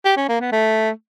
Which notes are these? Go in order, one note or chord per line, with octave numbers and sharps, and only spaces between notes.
G4
C#4
A#3
B3
A3